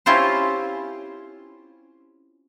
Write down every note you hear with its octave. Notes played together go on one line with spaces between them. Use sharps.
C4 C#4 E4 F4 G4 C5